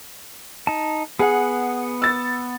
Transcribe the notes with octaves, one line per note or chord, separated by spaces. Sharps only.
D#4 A5
B3 G#4 F#5
E6 A6